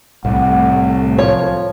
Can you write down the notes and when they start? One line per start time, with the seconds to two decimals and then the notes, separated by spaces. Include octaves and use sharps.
0.25 C2 A2 F#5
1.18 F3 C#5